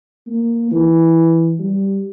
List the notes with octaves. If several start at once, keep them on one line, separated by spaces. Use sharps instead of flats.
A#3
E3
G3